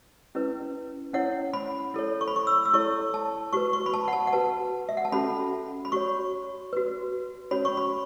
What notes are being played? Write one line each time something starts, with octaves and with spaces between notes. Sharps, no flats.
C#4 E4 B4
C#4 E4 C#5 F#5
B5
E4 A4 C#5
C#6
B5
C#6
E6
E6
E4 A4 C#5 C#6
A5
F#4 B4 C#6
C#6
B5
A5
F#5
A5
F#5
F#4 B4 A5
E5
F#5
A5
C#4 F#4 A4 B5
B5
F#4 C#5 C#6
F#4 B4
C#4 F#4 C#5 B5
C#6
B5